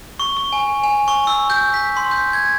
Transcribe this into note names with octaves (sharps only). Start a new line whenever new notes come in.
C#6
C#6
G#5
G#5
C#6
E6
G6
B6
C6
G6
G#6